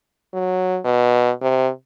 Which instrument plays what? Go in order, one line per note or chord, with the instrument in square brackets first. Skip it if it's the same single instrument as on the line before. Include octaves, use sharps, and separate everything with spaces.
[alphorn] F#3
B2
C3